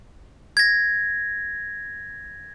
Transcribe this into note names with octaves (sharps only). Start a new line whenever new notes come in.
G#6 A#6